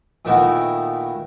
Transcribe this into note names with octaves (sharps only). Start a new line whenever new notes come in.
A#2 D#3 A3 B3 E4 F#4